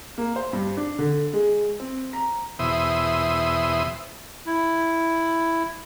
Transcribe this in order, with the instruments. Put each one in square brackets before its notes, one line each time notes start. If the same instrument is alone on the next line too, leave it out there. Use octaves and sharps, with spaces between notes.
[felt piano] A#3
C5
G2
D4
D3
G#3
C4
A#5
[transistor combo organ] E2 B2 C5 E5 D#6
[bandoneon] E4